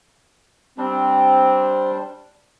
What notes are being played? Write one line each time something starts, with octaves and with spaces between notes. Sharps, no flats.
G3 C4 D4